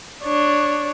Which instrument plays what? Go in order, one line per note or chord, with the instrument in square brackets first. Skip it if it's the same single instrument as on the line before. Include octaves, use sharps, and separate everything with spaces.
[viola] D4 C#5